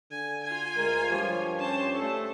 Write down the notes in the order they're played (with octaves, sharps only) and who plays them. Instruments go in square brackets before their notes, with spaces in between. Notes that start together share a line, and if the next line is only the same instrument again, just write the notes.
[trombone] D3 [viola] G#5
[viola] F4 G#5
[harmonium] D2 G#3 [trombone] A#4
[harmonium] G2 G4 C#5 [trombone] F3
[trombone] C#4 [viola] C5 A5
[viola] A3 A4